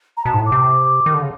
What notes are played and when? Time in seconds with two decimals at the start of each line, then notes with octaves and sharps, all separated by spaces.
0.17 A#5
0.25 B2 A5
0.34 G#2
0.39 A2
0.46 D6
0.52 C3
1.06 D#3
1.14 D3
1.22 C#3